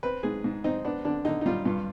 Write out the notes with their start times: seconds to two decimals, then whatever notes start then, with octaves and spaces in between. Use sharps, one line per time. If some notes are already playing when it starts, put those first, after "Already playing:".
0.03 C4 B4
0.23 G#2 G#4
0.44 G#2
0.64 C4 D#4
0.85 B3 D4
1.05 D3 D4
1.25 D3 D#4
1.41 D#4
1.46 G3 F4
1.65 G2 F4